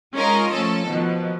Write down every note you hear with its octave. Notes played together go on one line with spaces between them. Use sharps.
G#3 C#4 D#4 F4 A#4 D#5
F3 A3 C#4 A4
B2 D#3 F3